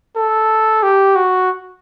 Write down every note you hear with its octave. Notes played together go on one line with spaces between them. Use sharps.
A4
G4
F#4